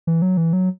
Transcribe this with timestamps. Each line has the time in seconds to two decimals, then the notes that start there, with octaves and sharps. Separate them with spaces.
0.07 E3
0.22 F#3
0.37 E3
0.53 F#3